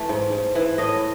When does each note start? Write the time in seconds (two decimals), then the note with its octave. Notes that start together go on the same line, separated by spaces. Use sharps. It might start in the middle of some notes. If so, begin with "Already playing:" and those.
Already playing: E3 A3
0.09 G#2
0.32 G#2
0.55 E3
0.78 A2 D#5